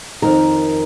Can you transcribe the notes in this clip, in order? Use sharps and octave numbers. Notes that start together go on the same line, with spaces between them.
F2 D#3 A#4